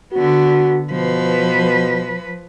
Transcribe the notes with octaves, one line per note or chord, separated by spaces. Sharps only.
D3 B3 F#4
B2 F3 B4